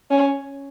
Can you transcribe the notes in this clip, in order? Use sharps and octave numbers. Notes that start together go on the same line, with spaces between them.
C#4